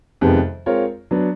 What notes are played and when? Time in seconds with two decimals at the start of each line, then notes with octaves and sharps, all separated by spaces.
0.21 F2 C3 D#3 G#3 B3
0.66 G#3 C4 F4 A#4 C#5
1.11 F#3 B3 D4